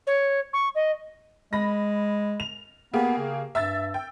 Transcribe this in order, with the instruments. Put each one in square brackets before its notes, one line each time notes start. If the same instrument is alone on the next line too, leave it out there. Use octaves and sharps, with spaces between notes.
[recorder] C#5
C#6
D#5
[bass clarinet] G#3 [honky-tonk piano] B5 A#6
[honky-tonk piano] F7
[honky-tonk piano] A#3 G4 G#4 [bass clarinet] B3
[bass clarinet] C#3
[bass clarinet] G2 [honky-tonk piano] E5 E6 A6
[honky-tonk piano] G5